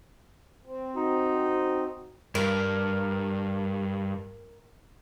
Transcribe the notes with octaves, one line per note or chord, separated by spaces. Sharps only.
C4
D#4 F#4
G2 A#4